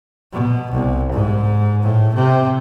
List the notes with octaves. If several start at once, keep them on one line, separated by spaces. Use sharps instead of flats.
B2
C2
G#2
A2
C3